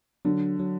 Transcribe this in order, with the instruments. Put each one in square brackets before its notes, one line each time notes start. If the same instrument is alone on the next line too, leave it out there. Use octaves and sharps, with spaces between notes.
[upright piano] D3 [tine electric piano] F#3
[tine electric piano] F#3